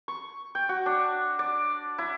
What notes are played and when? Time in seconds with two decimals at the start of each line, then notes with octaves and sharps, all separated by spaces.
0.08 C#6
0.55 G5
0.69 F#4
0.86 D4
1.39 D5
1.98 E4